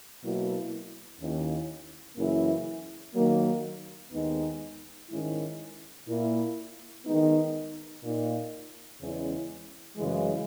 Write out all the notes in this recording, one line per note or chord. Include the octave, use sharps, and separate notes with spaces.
B2 F#3 A#3 E4
D#2 D#3 A#3 C#4 E4
F#2 C#3 E3 A#3 E4
D#3 F#3 A#3
D#2 D#3 G#3 B3 D#4
G#2 D#3 G#3 C#4 E4
A#2 A#3 E4
D#3 G#3 B3 D#4
A#2 A#3 D#4
E2 C#3 G#3 C#4 E4
F#2 C#3 E3 G#3